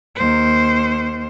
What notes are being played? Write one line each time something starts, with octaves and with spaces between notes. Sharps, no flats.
D#2 C5